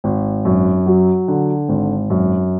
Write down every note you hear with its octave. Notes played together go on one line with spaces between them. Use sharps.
G#1
F#2
F#3
D3
G#1
F#2